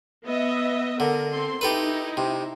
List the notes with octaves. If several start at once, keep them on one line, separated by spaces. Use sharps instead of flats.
B3 D#5 E5
D3 A#4
C4 A4 C6
D#4 E4 G4 A4 B4
C3